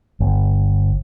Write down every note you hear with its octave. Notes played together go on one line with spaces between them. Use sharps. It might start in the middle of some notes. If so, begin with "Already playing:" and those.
G1